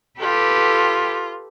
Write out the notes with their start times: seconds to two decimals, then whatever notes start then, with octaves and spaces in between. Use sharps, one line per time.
0.21 F4 G4 A4 B4